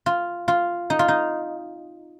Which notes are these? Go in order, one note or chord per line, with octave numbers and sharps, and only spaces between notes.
F4
F4
D#4
F4
D#4